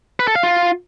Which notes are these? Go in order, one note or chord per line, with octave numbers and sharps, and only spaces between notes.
B4
A4
F5
F4